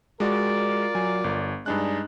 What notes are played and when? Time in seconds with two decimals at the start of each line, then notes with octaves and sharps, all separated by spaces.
0.20 G#3 F4 F#4 A#4 D5
0.95 F#3 G#5
1.24 G1
1.66 G2 G#3 D4 D#4 F#6